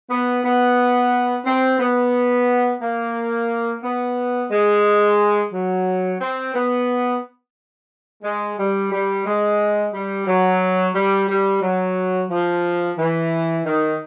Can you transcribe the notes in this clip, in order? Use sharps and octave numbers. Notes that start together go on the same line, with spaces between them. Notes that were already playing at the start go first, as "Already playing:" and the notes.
B3
B3
C4
B3
A#3
B3
G#3
F#3
C4
B3
G#3
G3
G3
G#3
G3
F#3
G3
G3
F#3
F3
E3
D#3